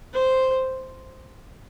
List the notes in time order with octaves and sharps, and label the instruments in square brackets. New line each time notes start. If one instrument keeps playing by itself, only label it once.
[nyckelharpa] C5